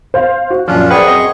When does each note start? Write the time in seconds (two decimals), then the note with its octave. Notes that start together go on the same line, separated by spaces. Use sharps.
0.14 C5 F5
0.50 F#4
0.68 F#2 A#2 F3 C#4 D4 F4
0.90 F#2 G#4 B4 C5 D5 F#5 G5 C#6
1.07 C4 D#5